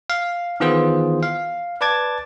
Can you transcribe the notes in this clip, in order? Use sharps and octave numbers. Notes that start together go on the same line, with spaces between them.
F5
D#3 E3 B3 F4 G#4 C5
F5
B4 D5 A5 D6 G#6 A6